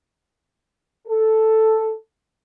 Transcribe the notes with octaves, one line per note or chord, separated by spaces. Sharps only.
A4